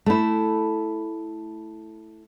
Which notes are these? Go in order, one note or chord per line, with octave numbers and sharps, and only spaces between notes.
A3 E4